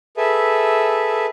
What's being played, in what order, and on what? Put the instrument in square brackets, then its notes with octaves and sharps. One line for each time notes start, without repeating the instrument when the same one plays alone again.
[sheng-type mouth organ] G#4 A4 B4 E5